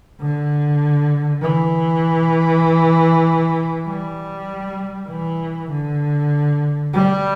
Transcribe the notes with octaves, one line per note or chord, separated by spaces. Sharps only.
D3
E3
G3
E3
D3
G3